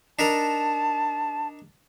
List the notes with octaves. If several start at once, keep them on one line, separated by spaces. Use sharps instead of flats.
D4 D#4 A#4 A5